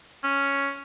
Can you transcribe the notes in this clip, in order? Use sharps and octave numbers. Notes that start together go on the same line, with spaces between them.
C#4